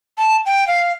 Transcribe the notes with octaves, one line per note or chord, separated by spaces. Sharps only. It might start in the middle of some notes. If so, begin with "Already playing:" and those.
A5
G5
F5